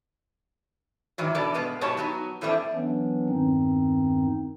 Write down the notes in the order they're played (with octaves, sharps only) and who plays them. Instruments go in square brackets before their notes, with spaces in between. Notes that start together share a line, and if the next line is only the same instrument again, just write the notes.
[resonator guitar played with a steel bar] G#2 D#3 E3 F#3
B2 E3 B3 D4 A4 D5
G2 B2 G#3 B3
G#2 B2 F#3 G4 C#5 A5
F#3 B3 D#4
A2 E3 G3 A3 C4 D4
[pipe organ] E3 F#3 B3 C#4 D4
E2 G2 D#3 C4 D#4